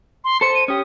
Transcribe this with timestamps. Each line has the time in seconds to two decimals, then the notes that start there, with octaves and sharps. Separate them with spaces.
0.24 C6
0.41 A4 C5 C#7
0.55 D#7
0.68 C#4 G4 D#6